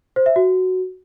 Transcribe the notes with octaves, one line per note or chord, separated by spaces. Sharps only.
C5
E5
F#4